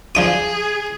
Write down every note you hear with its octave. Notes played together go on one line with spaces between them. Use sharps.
F3 D4 G#4 D#6